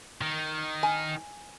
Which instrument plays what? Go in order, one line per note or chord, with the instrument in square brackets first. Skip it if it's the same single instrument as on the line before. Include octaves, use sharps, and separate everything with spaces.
[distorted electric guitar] D#3
[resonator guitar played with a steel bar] G#5